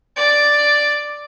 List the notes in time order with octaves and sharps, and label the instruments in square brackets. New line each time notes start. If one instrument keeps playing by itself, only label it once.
[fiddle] D5